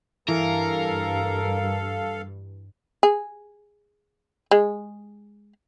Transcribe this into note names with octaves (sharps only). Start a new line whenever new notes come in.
G2 E3 A4 A#4 F5
G#4
G#3